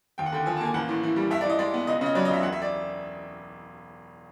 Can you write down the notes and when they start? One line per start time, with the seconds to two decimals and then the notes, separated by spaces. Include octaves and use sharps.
0.18 D#2 G5
0.26 F#5
0.32 D3 G5
0.46 F3 G#5
0.57 A5
0.61 A#3 G#5
0.74 A1 F#5
0.89 A2
1.03 E3
1.16 G3
1.30 G2 E5
1.41 D5
1.45 E3 D#5
1.59 G#3 D5
1.74 B3
1.87 C#2 D#5
2.01 C#3 D#5
2.15 F#3 D5
2.25 D#5
2.29 C#2 E5
2.43 E1 F#5
2.53 E5
2.62 D5